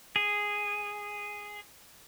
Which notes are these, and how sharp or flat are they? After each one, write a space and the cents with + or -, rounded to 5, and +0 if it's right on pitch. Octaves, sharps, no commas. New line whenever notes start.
G#4 -5